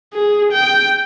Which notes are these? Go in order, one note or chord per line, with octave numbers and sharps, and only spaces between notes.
G#4
G5